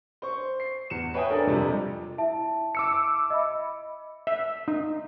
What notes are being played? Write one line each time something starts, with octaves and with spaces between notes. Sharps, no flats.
C5 C#6
C7
E2 C#7 E7
B4 C#5 E5 G5 G#5 D#6
D4 A4 A#4
F2 C3 G3
E4 E5 A5
D6 E6 C#7
D#5 E5 B5
E5
D#4